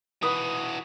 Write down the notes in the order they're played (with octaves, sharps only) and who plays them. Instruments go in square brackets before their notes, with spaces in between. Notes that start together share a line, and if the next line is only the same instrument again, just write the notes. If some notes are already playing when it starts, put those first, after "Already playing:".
[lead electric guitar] E3 F#4 [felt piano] B4 D#6